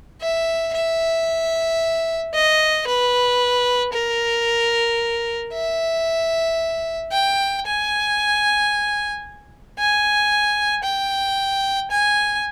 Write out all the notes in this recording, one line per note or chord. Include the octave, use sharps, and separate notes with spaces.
E5
E5
D#5
B4
A#4
E5
G5
G#5
G#5
G5
G#5